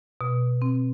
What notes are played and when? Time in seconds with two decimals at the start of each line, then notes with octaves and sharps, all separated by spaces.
0.21 B2
0.62 C4